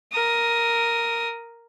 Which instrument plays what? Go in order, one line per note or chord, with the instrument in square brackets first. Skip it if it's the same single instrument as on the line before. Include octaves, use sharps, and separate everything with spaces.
[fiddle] A#4 D#6